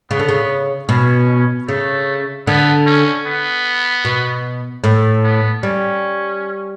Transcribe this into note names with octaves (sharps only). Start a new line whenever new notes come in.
C#3 B3
D3
C#3
B2 C#4
C#3 A3
D3 B3
C#4
B3
B2
A2 A3
B3
G3 C#4